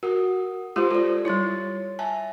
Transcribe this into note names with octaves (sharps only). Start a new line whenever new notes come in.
F#4 A#4 F#5 D#6
G#3 F4 G4 C5 C6
F4 A4 D5
G3 E4 C#5 C6 A6
E5 G#5 A5